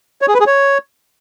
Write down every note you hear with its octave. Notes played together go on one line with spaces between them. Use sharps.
C#5
G#4
B4
G#4
C#5